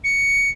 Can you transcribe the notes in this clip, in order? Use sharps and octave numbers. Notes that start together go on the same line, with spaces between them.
C#7